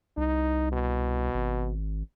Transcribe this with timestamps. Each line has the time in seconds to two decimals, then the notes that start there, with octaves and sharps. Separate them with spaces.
0.17 C2 D#4
0.72 B2
1.34 G#1